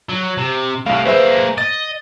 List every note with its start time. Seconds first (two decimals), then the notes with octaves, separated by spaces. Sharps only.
0.09 F#3
0.38 C3
0.86 C2 A2 F5
1.06 A#3 G#4 B4 C5 E5
1.58 D#5 A6